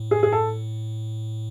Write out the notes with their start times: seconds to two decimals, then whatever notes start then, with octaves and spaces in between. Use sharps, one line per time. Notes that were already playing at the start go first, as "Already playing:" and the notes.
Already playing: A2
0.11 G#4
0.23 G#4
0.32 A4